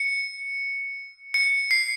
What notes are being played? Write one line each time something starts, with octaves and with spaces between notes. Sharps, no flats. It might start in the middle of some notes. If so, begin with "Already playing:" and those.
Already playing: C#7
C#7
C7